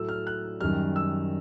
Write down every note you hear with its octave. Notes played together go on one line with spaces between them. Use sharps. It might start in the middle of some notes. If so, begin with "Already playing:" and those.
Already playing: A2 F#3 A3 E6
F6
F#6
F#2 D#3 G3 F6
E6